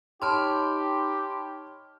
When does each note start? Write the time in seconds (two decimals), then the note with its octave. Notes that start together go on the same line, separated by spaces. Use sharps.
0.22 D#4 G4 C#5 A5 B5 C6 F6